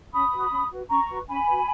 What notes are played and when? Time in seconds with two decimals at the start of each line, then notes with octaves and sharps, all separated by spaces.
0.13 C#4 B5 D#6
0.32 F#4 B4
0.52 C#4
0.71 F#4 B4
0.90 C#4 A#5 C#6
1.09 F#4 B4
1.28 C#4 G#5 B5
1.48 F#4 B4